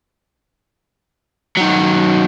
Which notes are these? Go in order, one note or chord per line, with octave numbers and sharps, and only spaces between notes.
D#3 F#3